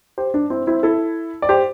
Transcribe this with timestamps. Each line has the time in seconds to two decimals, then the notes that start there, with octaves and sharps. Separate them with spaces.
0.18 G4 C5
0.34 D4
0.50 C4 E4
0.67 C4 E4
0.83 E4 A4
1.42 D5
1.49 G4 C5